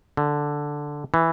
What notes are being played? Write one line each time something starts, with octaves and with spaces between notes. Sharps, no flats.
D3
E3